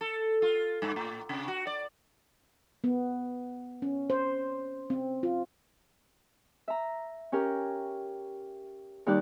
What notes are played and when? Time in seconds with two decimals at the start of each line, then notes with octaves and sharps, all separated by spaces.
0.01 A4
0.42 F4
0.82 G2
0.96 A2
1.29 C3
1.48 F#4
1.67 D5
2.84 B3
3.82 C#4
4.10 C5
4.90 C4
5.23 F4
6.68 E5 A#5
7.32 C#4 G4 A#4
9.06 D#2 G3 D#4 G4 D5 F#6